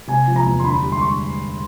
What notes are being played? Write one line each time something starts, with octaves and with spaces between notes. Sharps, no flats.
C3 G#5
F3
A#5
E2
C6
D3 B5
G3
C6
C#6